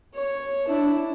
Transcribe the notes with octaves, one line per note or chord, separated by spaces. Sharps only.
C#5
D4 E4